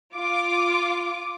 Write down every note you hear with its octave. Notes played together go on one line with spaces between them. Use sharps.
F4 D6